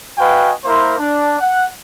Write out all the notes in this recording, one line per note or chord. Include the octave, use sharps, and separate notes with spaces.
F#4 B4 D#5 F5 G5 G#5
A#3 E4 A#4 C5
D4
F#5